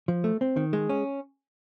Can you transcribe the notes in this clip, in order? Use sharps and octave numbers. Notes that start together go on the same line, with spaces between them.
F3
A3
C4
D#3
G#3
C#4